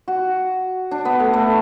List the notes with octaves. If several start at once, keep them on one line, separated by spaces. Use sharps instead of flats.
F#4
D4
B3
A3
A3